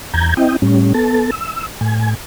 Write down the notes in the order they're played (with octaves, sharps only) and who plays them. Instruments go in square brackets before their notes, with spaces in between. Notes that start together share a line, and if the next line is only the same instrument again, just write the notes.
[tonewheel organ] E2 A#5 G6 G#6
C4 E4 D#5 G5
A2 G3 C#4
B3 A4 A5
E6
A2 G#5